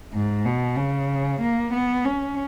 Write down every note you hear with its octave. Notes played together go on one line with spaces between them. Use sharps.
G#2
B2
C#3
A#3
B3
C#4